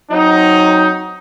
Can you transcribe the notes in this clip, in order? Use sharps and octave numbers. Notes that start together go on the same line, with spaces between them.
F#3 C4 D#4